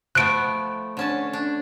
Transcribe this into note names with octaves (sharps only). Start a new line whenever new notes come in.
F3 A3 B3 F#6 D7
D3 C#4 A5
D4